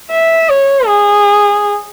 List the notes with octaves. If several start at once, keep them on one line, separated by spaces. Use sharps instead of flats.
E5
C#5
G#4